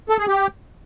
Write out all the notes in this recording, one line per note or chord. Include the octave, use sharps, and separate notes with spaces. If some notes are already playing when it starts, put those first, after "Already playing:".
A4
G#4
G4